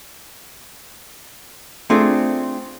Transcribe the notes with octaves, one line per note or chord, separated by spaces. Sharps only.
A3 C4 D4 F4 G#4